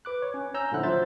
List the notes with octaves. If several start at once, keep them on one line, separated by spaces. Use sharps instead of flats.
B4 D6 F#6
C#5
C#4
C#4 A#5 E6 G6
A#2 D3 F3 E4 F#5 F#6
F3 F#3 C5 E5 G6 A6